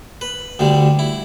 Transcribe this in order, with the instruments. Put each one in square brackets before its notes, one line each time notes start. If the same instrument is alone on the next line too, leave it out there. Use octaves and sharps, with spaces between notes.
[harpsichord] B4
D2 D3 G3
E4